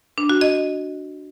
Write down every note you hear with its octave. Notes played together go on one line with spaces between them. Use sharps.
D4
F#4
D#5